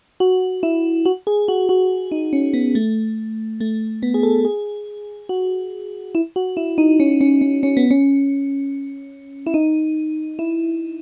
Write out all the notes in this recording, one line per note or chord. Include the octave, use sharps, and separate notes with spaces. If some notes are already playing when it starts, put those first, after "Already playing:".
F#4
E4
F#4
G#4
F#4
F#4
D#4
C#4
B3
A3
A3
B3
G#4
A4
G#4
F#4
E4
F#4
E4
D#4
C#4
C#4
C#4
C#4
B3
C#4
E4
D#4
E4